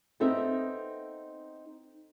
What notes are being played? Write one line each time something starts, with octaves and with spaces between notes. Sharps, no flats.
B3 C4 D#4 A4 E5